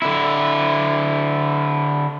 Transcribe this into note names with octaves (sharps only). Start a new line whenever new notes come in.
D3 E4